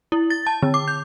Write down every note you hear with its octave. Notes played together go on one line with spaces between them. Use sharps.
E4
A6
A5
D3
D6
G6